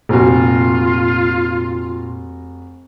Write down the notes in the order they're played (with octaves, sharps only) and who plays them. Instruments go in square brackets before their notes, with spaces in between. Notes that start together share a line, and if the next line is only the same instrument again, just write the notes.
[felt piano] F1 F#4 [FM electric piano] A#2 [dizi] F4